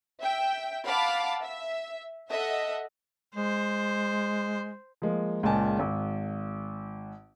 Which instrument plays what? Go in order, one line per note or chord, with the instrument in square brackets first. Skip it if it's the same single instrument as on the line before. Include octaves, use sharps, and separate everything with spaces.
[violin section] E5 G5
F5 F#5 A5 B5 D6
E5
A4 D#5 E5 F#5
[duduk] G#3 [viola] C5
[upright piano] F3 G#3 A#3
C#2 A#2 G#3 G#5 A5
G#1